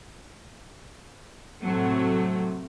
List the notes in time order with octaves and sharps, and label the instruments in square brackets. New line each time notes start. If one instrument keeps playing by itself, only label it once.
[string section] A2 C3 F#3 A3